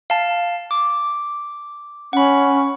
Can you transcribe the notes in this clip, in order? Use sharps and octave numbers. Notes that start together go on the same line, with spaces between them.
F5 A5
D6
C#4 F#5 B5